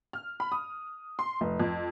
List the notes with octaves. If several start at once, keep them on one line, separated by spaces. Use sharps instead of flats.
F6
B5
D#6
C6
F1
F2